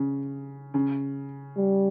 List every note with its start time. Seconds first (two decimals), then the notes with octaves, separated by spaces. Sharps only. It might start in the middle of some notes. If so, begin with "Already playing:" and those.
Already playing: C#3
0.74 C#3
1.57 G3